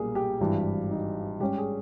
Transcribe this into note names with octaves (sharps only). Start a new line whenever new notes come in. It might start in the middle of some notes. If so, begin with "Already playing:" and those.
Already playing: B1 A#2 G3 A#3 G#4
G4
G#1 G2 E3
D#4
G#2 G3 C#4 G4
G#4